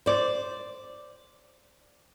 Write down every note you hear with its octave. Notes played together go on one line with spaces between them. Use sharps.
C5 D5